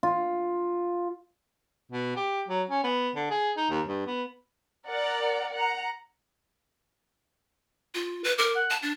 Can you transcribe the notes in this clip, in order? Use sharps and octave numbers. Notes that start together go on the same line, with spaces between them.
F4
B2
G4
F#3
C#4
B3
D3
G#4
D#4
D#2
G2
B3
A#4 D5 F#5 A#5
F#5 A#5
F4
B4
A#4 D6
F#5
A5
D4 A6